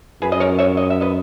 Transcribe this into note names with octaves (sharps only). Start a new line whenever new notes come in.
F#2 G#4 B4
D#5
A#4 C#5
C#5 E5
D#5
E5
B4 D#5